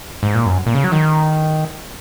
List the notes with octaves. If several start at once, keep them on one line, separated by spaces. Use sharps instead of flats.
G#2
A#2
F#2
A#2
C#3
F#3
D#3